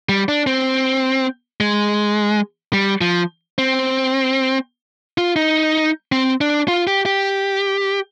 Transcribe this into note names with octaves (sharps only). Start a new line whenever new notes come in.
G3
D4
C4
G#3
G3
F3
C4
F4
D#4
C4
D4
F4
G4
G4